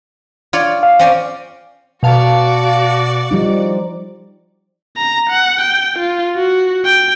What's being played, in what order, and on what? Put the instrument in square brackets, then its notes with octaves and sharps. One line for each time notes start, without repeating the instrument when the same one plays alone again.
[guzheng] F4 C#5 D5
[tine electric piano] F5
[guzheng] C4 C#4 D5
[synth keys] B2 F5 A5 [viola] F#4 D5
[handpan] F3 G3 D#4
[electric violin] A#5
F#5
G5
F4
F#4
G5